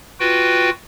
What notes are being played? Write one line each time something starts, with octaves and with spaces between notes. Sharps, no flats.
F4 F#4 B4 G5